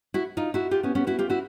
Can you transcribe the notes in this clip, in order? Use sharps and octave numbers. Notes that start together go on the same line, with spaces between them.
E4 F#4
D#4 F4
E4 F#4
F4 G4
B3 C#4
B3 C#4
E4 F#4
F4 G4
E4 F#4